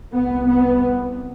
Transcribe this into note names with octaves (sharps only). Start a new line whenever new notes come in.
C2 B3
C3
B3